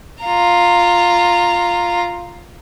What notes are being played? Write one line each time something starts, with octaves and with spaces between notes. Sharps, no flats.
F4 A#5